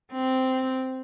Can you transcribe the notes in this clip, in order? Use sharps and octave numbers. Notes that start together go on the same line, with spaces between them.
C4